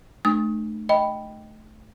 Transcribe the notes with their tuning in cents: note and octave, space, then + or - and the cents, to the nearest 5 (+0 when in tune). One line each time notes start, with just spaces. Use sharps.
A3 -20 D4 +45 D#6 +25
D#5 +0 G5 +0 B5 +0